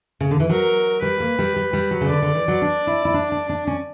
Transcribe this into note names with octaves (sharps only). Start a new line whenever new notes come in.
C#3
D3
E3
F#3 A#4
G3 B4
A#3
G3
G3
G3
F#3
C#3
D3 D5
D3
E3
F#3
D4
E4
E4
D4
D4
D4
C#4